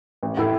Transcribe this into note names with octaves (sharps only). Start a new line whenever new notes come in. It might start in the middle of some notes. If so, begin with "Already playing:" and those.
A1
A2 A3 E4